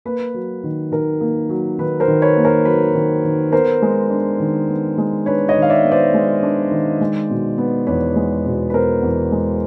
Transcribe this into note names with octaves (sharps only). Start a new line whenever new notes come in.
A#3 B4
F#3
D#3
D#3 A#4
A#3
F#3
D#3 B4
A#4 C5
D#3
B4 C#5
A#3
A#4 C5
F#3 B4
D#3
D#3
B3 A#4 C5
G#3
D4
D#3
B3
G#3
D4 B4 C#5
C#5 D#5
D#3
F5
D5 E5
B3
C5 D5
G#3
D4
D#3
G#3
B2
B3
E2 B4 C#5
G#3
B2
B4
B3 A#4 C5
E2
G#3